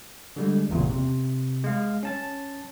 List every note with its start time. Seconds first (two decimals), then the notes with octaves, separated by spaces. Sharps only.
0.36 D3 G3 G#3
0.69 G#1 E2 A#2 C#3
0.90 C3
1.64 G#3 F5
2.03 C#4 A5 A6